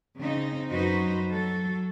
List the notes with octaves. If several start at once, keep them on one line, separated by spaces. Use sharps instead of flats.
C#3 C4 D#4
F#2 F#3 D#4 F#4 B4 C5
F#3 A4